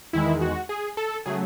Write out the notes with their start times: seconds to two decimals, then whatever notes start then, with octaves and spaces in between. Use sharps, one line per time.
0.13 E2 D#3 G#3 E4
0.41 F#4
0.69 G#4
0.97 A4
1.26 C#3 F#3 A3 G#4